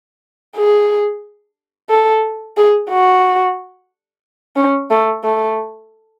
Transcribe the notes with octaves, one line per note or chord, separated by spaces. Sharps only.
G#4
A4
G#4
F#4
C#4
A3
A3